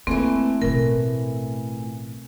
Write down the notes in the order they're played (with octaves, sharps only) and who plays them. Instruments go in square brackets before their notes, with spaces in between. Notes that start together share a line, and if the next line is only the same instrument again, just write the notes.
[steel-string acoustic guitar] E3 A3 [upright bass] A#3 [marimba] C4
[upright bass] A1 B2 [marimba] A#4